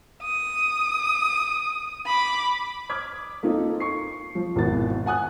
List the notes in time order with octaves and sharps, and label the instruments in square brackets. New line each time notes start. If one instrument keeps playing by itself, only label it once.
[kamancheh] D#6
B5 D6
[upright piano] D6 D#6 F6 G#6 B6
A#3 C4 D#4 F4 A4
C#6 C7
F3
G#1 E2 B2 E3 B3 A6
F#5 G#5 D#6 F#6